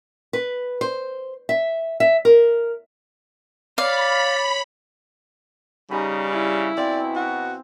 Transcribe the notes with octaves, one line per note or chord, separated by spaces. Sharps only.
B4
C5
E5
E5
A#4
C#5 D5 F5 B5
C#3 G3 D#4 G#5 B5
E4
B2 C4 D5 F5
F#4